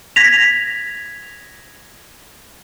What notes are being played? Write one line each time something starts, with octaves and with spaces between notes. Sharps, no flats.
G#6 A#6 B6 F7